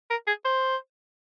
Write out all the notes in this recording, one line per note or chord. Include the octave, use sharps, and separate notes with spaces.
A#4
G#4
C5